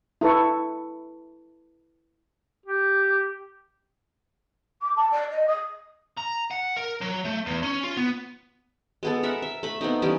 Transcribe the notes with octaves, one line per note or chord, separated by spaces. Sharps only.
E4 A4 B4 C#6
G4
D6
A5
D5
D#5
D#6
A#5
F#5
A#4
F#3
A3
E2
C#4
F4
B3
G#3 B3 A4
A#4 E5 F#5
E5
A3 B5
B3 C4 D#4
E3 G3 C#4